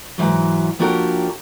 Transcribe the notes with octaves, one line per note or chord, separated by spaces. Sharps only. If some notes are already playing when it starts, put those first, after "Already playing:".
G#2 E3 F#3
F3 A#3 D4 F#4 G4 A#4